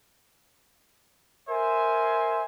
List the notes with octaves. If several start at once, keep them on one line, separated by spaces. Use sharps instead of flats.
A#4 C5 E5 G#5